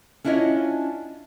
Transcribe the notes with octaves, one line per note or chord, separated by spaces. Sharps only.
C#4 D4 E4 F4 C#5 D#5